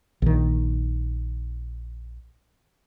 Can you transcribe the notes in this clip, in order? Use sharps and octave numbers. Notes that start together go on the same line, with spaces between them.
A#1 D#3